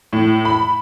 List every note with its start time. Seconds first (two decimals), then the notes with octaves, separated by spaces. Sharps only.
0.13 A2
0.45 B5